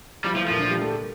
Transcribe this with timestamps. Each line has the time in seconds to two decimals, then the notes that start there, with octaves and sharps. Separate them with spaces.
0.24 F3 G3 F4
0.33 E3 E4
0.36 F3
0.42 A3
0.48 A#2 F3 A#3
0.59 D3 D4
0.70 G3 G4
0.81 A3 A4